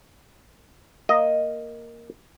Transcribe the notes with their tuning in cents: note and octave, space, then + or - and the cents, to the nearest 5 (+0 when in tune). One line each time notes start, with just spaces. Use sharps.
A#3 +0 D#5 +0